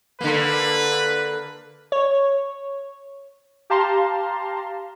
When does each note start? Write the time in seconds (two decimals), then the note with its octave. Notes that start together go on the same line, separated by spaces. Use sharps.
0.21 D3 A#3 B4
1.92 C#5
3.70 G4 F5 A5 A#5 C6